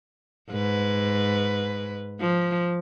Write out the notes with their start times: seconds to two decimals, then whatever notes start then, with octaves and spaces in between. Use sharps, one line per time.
0.50 G#2 B4
2.20 F3